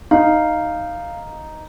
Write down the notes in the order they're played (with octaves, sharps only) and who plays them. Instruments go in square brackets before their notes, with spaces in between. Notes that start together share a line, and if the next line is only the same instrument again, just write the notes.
[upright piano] D#4 [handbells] F5